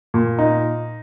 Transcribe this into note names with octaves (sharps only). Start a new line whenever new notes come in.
A#2
D#4